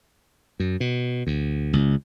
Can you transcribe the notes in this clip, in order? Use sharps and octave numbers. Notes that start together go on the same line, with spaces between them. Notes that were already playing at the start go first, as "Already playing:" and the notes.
F#2
B2
D2
C#2